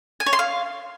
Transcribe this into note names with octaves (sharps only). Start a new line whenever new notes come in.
G#5
C#5
C6
F5